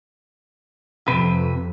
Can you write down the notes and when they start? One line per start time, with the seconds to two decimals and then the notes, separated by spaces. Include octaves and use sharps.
1.08 F2 C3 B4